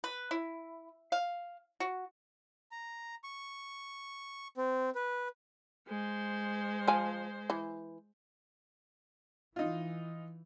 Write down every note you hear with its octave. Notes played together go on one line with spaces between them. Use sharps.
B4
E4
F5
F#4
A#5
C#6
C4
B4
G#3 C5
F3 G#5
E3
E3 D#4 F4